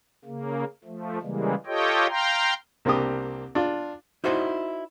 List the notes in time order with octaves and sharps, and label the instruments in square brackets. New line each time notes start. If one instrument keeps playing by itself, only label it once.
[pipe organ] C#3 A#3
F3 A3
C#3 E3 G3 G#3 A#3
F4 G4 A4 C#5 D#5 G5
F5 G5 A#5 C6
[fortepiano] C2 A#3 C4 D4 G4 D#6
D4 F4
[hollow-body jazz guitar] D#4 E4 F#4 C5 D5 D#5